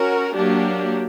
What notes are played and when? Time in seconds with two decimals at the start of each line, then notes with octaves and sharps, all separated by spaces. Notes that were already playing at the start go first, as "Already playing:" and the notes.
Already playing: C#4 F#4 A#4
0.36 F#3 A#3 D4 G4